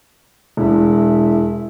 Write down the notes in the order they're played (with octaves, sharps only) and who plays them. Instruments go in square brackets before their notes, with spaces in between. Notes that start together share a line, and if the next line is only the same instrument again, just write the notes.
[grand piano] E1 [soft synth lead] E4